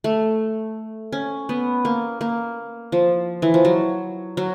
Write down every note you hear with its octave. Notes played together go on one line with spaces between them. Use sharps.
A3
C#4
B3
A#3
A#3
F3
E3
F3
F#3
F#3